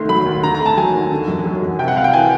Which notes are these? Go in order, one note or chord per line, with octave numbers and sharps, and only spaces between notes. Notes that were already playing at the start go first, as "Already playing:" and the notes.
Already playing: C2 D#3 A3 C6
F#3 B5
D#2
D3 A#5
A#5
A3
A5
F#3 G#5
D#2
D3
F#2
F#3
F#2
C3 G5
F#5
C2 F5
G5
E3 G#5